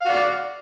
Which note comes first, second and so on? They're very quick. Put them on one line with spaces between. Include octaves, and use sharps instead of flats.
F5 F#4 D5